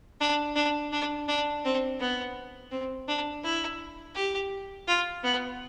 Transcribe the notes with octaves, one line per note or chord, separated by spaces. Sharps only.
D4
D4
D4
D4
C4
B3
C4
D4
E4
G4
F4
B3